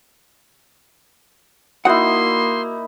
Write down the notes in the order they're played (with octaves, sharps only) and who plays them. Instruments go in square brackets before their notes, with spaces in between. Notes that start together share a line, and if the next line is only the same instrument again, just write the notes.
[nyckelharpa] A#3 [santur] D#4 E4 [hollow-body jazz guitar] F#4 F#5 [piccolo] C6